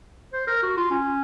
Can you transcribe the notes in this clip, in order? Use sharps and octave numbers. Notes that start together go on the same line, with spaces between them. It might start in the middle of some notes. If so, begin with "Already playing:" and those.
C5
A#4
F#4
F4
C#4